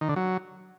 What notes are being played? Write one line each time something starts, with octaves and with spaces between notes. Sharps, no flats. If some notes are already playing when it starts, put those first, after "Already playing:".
D#3
D3
F#3